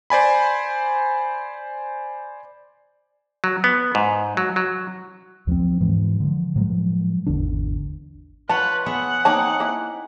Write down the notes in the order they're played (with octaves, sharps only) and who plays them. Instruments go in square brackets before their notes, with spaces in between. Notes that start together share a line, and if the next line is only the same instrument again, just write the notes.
[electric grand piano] C5 D5 G#5 B5
[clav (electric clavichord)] F#3
B3
G#2
F#3
F#3
[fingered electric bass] D#2 F3 A#3 C4
G#2 E3 G#3
D3 F3
A2 F3 F#3 G#3
G#1 E2 D3 D4
[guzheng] F4 C#5 F#5 [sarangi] B4 [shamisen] A5
[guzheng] B3 G#4 E5 [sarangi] F#5
[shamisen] A#3 C#5 A5 [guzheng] C4 D#4 G#4
[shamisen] A#3 E4